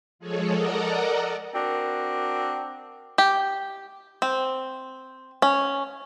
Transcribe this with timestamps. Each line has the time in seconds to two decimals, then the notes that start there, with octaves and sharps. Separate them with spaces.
0.19 F3 G#3 G#4 A4 C#5
0.53 A4 A#4 D5 D#5 F#5 A#5
1.55 C4 D4 F#4 A#4
3.18 G4
4.22 C4
5.42 C#4